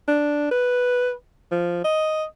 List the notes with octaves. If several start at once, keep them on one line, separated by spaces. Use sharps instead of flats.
D4
B4
F3
D#5